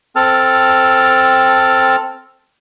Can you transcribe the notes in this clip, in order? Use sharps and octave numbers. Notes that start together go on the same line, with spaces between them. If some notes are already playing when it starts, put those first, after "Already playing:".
C4 A4 A5 F6